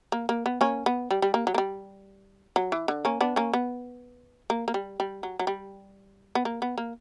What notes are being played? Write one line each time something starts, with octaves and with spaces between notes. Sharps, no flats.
A#3
A#3
B3
A#3 C#4
B3
G3
G3
A#3
F#3
A#3
G3
F#3
E3
D3
A#3 C#4
B3 D4
A#3 C#4
B3
A#3
A#3
G3
G3
F#3
F#3
G3
B3
A#3
B3
A#3